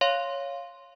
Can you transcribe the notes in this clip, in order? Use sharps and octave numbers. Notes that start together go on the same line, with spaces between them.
C#5 F5 C6